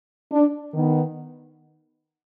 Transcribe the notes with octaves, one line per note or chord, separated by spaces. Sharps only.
D4
D#3 B3